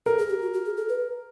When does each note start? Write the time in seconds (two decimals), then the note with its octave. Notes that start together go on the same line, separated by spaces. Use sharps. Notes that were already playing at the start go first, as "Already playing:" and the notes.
0.06 A4 A#4
0.18 G#4
0.29 G4
0.42 F#4
0.53 F#4
0.65 G#4
0.77 A4
0.89 B4